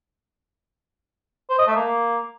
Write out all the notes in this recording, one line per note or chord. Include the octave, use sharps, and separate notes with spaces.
C5
D#5
A3
A#3